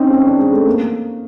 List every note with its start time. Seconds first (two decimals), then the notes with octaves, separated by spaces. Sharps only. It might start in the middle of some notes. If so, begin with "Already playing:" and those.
Already playing: C4 C#4 D#4
0.10 C#4
0.25 D4
0.38 G#3
0.53 A3
0.66 A#3